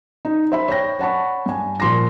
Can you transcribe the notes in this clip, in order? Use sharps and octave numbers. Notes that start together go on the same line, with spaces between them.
D#4
C5 E5 B5
C#5 G5 A#6
C#5 F#5 A5 B5 C#6
G2 G#5
A#2 F3 C6 D6 A#6